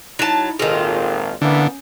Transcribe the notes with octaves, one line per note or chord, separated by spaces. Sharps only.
F#3 D#4 E4 A5
G#1 A#2 D#3 F4 G#4 A4 D#5
D3 E3 A#3 B3 C#4